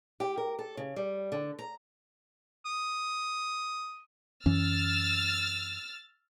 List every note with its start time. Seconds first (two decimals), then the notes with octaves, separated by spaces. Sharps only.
0.20 G4
0.37 A#4
0.59 A4
0.77 C#3
0.96 G3
1.32 D3
1.59 A#5
2.66 D#6
4.46 F#2 E3 C#4 E6 F6 A6